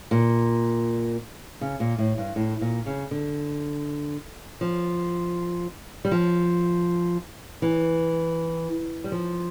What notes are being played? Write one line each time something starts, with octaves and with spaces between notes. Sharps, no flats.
A#2
C#3
A#2
A2
G2
A2
A#2
C#3
D3
F3
G3
F3
E3
G3
F3